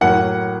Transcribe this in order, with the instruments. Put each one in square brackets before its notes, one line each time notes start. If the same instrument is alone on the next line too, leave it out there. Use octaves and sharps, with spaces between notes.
[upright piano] A2 F#3 A#3 F#5